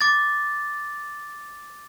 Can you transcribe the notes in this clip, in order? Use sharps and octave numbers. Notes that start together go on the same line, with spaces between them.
D6 A6